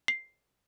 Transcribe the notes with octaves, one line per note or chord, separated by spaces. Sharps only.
C7